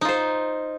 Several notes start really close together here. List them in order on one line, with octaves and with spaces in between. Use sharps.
D#4 F4 C5